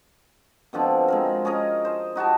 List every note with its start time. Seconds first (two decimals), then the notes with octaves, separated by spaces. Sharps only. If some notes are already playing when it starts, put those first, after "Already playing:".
0.73 B2 D3 F3 C4
1.08 G#3 C4 A#4
1.45 C#4 G#4 A#4 D#5
1.85 C5
2.15 D#4 F#4 G4 A5